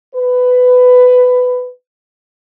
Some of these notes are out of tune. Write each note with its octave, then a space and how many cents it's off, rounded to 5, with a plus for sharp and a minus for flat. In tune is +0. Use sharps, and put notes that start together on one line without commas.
B4 +15